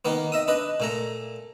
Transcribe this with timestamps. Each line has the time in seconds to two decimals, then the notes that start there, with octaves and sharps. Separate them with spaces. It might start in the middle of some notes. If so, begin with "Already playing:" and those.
0.05 D#3 A#3 B3
0.32 D#5 E5 D#6
0.48 D4 B4 D#5
0.80 A#2 A3 A#5